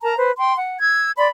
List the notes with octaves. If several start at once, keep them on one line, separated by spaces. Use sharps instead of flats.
A#4 A5 A#5
B4 C5
G5 C6
F#5
E6 G#6
D5 B5 C6